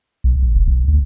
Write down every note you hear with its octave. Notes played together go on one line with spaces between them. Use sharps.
B1
A#1
E1
B1
D2